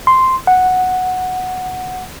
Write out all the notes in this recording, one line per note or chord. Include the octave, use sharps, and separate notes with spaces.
C6
F#5